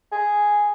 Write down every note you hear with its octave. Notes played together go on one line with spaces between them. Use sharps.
G#4